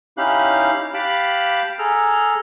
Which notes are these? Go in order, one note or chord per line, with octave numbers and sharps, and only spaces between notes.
C#4 D#4 E4 G4 F5 F#6
G4 F5 A5 B5 D6 F#6
G#4 A4 A#5 F6